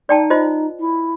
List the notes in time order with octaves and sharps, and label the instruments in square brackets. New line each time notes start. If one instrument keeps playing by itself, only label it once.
[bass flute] D#4 [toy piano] D5 G5 A5
[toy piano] F4 C5 D#5
[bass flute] E4